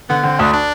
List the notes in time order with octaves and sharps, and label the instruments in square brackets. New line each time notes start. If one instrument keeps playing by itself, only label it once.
[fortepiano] D3 [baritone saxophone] B3
[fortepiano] D3 [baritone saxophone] C4
[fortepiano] D2 [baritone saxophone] D4
[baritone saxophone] D4